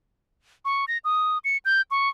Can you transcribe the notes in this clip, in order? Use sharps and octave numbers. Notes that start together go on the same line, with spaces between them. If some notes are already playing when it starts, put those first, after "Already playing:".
C#6
A#6
D#6
C#7
G6
C#6